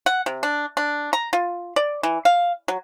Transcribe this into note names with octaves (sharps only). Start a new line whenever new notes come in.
F#5
C3
D4
D4
A#5
F4
D5
E3
F5
F#3